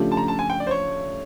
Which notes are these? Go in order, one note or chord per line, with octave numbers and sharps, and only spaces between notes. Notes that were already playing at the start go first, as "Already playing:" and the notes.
Already playing: C#3 F3 A3 D4 G4
A5
A#5
A5
G#5
G5
D5
C5
C#5